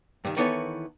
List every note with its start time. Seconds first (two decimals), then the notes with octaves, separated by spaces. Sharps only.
0.25 G2 D#3
0.36 D#3 E3 B3 E4 A4 C#5